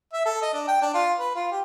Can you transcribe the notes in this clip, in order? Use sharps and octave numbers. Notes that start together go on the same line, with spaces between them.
E5
A4
D#5
D4
G5
D4
F4
B4
F4
G4